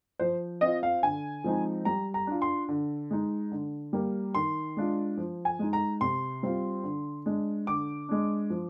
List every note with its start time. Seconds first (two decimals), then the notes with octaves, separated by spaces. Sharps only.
0.19 F3 C5
0.61 C4 F4 D#5
0.83 F5
1.03 D3 G#5
1.44 F3 G#3 C4 D#4
1.85 G3 A#5
2.14 A#5
2.27 D4 F4
2.42 C6
2.69 D3
3.11 G#3 D#4
3.52 D3
3.93 G3 A#3
4.35 D#3 C6
4.77 G#3 D4 F4
5.17 F3
5.45 G#5
5.59 G#3 D#4
5.73 A#5
6.01 C3 C6
6.43 G3 C4 F4
6.84 D3
7.26 G#3 D4
7.67 D3 D6
8.09 G#3 D4
8.50 F3